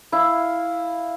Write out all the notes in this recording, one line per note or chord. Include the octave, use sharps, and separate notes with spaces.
E4 F5